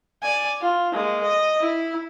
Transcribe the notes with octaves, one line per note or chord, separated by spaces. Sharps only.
D5 G#5
F4
G#3 A#3
D#5
E4